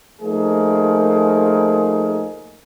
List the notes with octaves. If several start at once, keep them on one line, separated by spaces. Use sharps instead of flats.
F3 A3 A#3 D#4 G#4